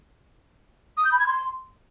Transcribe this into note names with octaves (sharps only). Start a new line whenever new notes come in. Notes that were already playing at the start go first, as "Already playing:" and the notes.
D#6
G6
B5
G#6
C6